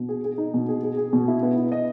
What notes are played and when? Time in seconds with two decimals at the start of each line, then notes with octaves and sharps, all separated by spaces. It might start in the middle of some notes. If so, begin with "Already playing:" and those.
Already playing: B2
0.09 G#4
0.24 G#4
0.38 D#4
0.54 B2
0.68 G#4
0.83 G#4
0.97 G#4
1.13 B2
1.28 E4
1.43 B3
1.58 E4
1.72 D#5